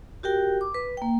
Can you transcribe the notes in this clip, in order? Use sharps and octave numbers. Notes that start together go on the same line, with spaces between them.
F#4 G4 A#4 G5
D6
B4
A#3 G5